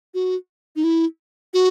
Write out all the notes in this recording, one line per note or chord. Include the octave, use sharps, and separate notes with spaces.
F#4
D#4
E4
F#4